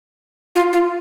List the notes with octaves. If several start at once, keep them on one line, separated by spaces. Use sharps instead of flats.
F4
F4